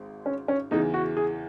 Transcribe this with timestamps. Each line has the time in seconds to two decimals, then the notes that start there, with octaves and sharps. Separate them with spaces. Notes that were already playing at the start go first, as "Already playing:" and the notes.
Already playing: G#1 G#2
0.26 C#4
0.48 C#4
0.71 E2 C#3 E3 D#4
0.94 F#4
1.17 G#4